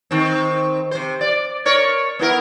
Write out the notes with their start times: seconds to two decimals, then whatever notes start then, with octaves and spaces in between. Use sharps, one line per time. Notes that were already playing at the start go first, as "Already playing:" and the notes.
0.11 D#3 C4
0.91 C3 C5
1.21 D5
1.65 A#4 C#5 D5
2.19 B3 E4 A#4